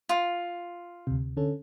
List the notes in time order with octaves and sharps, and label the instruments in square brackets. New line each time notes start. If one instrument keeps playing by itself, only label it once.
[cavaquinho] F4
[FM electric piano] D2 C3
D3 C#4 A4